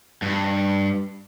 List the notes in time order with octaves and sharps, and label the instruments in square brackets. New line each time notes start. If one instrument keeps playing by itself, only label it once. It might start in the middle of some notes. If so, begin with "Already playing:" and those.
[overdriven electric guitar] G2